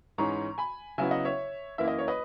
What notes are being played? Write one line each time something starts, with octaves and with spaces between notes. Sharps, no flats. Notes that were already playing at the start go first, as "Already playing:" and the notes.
G#2 E3 G#3 C#4 A#5 C#6
G#5 B5
C#3 F#3 B3 E4 E5 G#5
D#5 F#5
C#5 E5
F#2 E3 A#3 E4 E5
D#5
C#5
B4 D#5